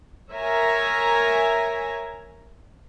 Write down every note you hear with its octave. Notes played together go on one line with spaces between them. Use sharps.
A#4 C#5 E5 G#5 A#5